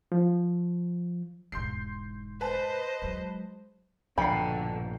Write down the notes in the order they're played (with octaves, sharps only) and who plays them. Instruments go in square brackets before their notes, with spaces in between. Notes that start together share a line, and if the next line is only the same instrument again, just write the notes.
[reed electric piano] F3
[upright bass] E1 G#2 [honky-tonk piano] C6 G6 C7
[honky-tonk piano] B4 A5 [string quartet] C5 D#5
[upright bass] F#3 G#3
[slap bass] A#1 G2 B2 [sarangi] D3 [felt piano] G5 A#5 C7 [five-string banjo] B5